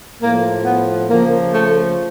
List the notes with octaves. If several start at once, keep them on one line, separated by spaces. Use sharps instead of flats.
A2 F3 A#3
B3
C#3 F3 A#3
A3